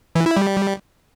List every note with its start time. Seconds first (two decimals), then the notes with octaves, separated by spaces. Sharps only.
0.15 E3
0.26 E4
0.37 G3